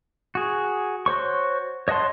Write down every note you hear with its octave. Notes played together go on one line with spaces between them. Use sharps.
F#4 G#4
F#4 C5 C#5 C#6
C#5 D#5 F#5 A5 C6